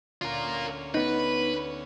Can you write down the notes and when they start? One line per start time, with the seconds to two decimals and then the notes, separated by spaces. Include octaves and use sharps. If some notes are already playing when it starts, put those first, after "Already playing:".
0.22 D2 C#4 F4 A#4
0.94 B3 D#4 B4